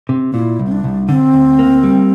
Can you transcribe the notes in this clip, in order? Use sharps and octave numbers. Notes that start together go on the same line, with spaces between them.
C3
A#2 E4
C2
C4
D4
C2
D3 C4
D2
A#3
G3